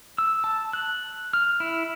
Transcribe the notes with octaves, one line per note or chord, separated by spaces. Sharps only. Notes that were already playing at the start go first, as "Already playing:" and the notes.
E6
A5
F#6
F6
E4